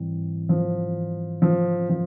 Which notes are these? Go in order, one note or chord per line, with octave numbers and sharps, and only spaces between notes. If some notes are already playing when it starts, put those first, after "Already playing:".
Already playing: G#2 E3 G3 C4
F3
F3
F3